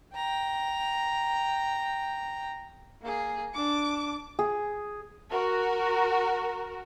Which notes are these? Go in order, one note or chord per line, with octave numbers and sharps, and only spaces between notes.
G5 A#5
A#3 G#4
D4 D6
G#4
F#4 A#4